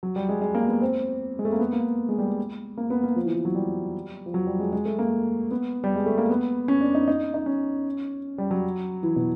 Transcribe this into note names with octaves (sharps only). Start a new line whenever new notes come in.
F#3
G3
G#3
G#3
A#3
B3
C4
G#3
A3
A#3
B3
A#3
G#3
G3
A#3
B3
A#3
F3
E3
E3
F#3
G3
F3
F#3
G3
G#3
G#3
A3
A#3
B3
G3
G#3
A3
A#3
B3
C#4
D4
D#4
D#4
D#4
C#4
G3
F#3
E3
B2